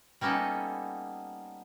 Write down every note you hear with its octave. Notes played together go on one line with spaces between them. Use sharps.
G3 A#3 B3 C#4 D#4 A4